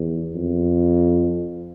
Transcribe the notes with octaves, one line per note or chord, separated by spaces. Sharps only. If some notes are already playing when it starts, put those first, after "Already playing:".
Already playing: E2
F2